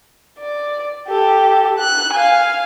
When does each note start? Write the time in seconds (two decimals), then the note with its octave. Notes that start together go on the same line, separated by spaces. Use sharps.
0.39 D5
1.08 G4 A4
1.78 F#6
2.13 F5 G#5